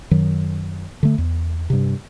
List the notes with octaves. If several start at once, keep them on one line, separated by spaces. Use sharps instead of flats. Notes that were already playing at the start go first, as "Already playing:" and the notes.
F#2 D#3 F#3
D3 A3
E2
G2 C3